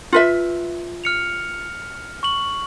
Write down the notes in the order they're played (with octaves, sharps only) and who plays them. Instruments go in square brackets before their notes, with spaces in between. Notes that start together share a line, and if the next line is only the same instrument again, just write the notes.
[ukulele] F4 B4 E5
[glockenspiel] F6 C#7 F7
C#6 F#7